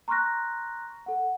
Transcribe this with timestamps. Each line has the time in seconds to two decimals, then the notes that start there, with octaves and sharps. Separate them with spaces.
0.08 A#5 C6 C#6 F6 F#6 A#6
1.06 A4 F#5